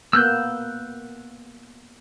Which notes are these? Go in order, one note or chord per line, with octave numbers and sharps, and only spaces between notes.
A#3 B3 E6 F#6 G6